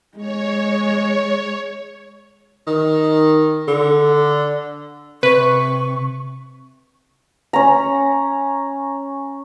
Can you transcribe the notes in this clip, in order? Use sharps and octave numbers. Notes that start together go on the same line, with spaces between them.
G#3 C#5
D#3
D3
C3 B4 C#6
C#4 A#5